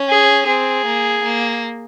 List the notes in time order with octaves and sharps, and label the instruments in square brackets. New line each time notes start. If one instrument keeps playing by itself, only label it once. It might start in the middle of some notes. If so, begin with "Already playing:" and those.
Already playing: [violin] C#4
[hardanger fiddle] G#4
[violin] C4 [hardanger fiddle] G#4
[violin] A#3
A#3